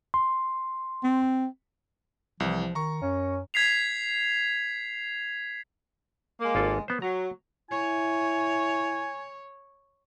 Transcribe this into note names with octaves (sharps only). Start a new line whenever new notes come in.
C6
C4
C2 E3 F3
D#3 A#5 C#6
F#2 C#4
G#6 B6 C7 F7
G#3 A#3
G#1 F4 A4
B3 C5
F#3 A#5
E4 C#5 G#5